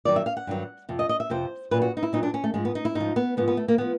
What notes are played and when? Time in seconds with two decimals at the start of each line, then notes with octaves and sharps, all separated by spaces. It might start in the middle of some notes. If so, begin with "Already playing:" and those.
0.05 G2 D#3 F#3 D5
0.16 E5
0.26 F5
0.37 F#5
0.47 G2 D#3 F#3
0.89 F2 C3
0.99 D#5
1.09 D#5
1.20 E5
1.30 F2 C3 F3 C5
1.71 A#2 F#3 B4
1.82 F#4
1.97 D#4
2.03 E4
2.13 A#2 F#3 D#4
2.23 D4
2.34 C#4
2.44 A3
2.54 G#2 F3 G#3
2.65 B3
2.75 D#4
2.85 E4
2.95 G#2 D#4
3.00 F3
3.16 B3
3.37 G#2 F3 B3
3.48 B3
3.57 A3
3.68 A#3
3.78 F3 B3